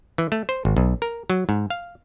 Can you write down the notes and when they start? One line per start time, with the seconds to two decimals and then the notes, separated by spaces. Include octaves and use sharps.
0.18 E3
0.32 A3
0.49 C5
0.65 G#1
0.77 B1
1.02 A#4
1.30 F#3
1.49 G#2
1.70 F5